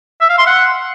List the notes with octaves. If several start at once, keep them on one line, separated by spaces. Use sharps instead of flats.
E5
F5
C6
F#5